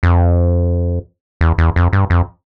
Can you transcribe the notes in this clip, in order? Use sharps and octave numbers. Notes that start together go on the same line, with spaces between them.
F2
E2
E2
F2
G2
F2